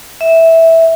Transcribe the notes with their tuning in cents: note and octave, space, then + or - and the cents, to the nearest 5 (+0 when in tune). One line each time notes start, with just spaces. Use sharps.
E5 -10